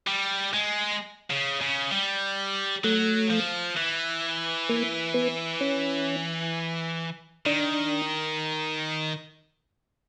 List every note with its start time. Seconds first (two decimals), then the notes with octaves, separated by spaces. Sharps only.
0.07 G3
0.53 G#3
1.30 C#3
1.61 C#3
1.91 G3
2.84 F#3 A3
3.30 F3
3.77 E3
4.69 A#3
5.14 B3
5.61 C#4
7.46 D#3 D4